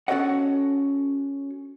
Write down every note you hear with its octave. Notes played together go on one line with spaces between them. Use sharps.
C#4 F#4 A4 C#5 D#5 F#5